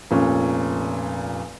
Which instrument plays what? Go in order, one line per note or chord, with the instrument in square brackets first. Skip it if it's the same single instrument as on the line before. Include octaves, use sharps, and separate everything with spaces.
[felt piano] F1 A#2 C#4